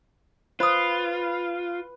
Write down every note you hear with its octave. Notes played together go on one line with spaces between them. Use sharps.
F4 B4 C5 D#6